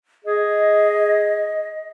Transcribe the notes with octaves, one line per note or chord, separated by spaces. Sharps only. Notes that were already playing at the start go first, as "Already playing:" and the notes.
G#4 D#5